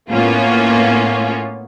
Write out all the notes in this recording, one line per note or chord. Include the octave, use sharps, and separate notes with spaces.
A2 A#3 B3 C#4 F4